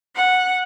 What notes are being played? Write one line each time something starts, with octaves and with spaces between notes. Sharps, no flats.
F#5